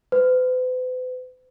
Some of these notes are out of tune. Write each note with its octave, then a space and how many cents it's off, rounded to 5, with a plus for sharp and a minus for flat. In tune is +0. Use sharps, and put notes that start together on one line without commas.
B4 +45